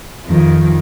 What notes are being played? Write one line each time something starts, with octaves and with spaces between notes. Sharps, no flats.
F2 D#3